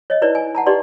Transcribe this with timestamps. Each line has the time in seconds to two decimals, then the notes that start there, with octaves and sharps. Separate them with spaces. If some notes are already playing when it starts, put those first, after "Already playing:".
0.10 C#5 D#5
0.22 D#4 E4 B4 C#5 D5
0.35 G#5
0.55 F#5 A5 A#5
0.66 D#4 G4 B4 D5 C6